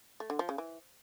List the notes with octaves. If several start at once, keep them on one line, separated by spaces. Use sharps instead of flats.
A3
D3
F3
C#3
E3